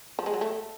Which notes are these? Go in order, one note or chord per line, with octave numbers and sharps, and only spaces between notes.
F3
G#3
F#3
A3